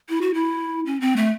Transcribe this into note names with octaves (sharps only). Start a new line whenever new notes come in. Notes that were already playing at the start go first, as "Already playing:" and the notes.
E4
F#4
E4
C#4
C4
A3